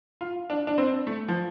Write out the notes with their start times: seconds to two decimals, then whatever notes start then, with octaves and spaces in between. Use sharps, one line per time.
0.21 F4
0.50 D4
0.67 D4
0.78 C4
1.07 A3
1.28 F3